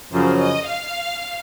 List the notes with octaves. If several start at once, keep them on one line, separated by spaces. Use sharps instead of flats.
F#2 C#3 F3 C5
D#5
F5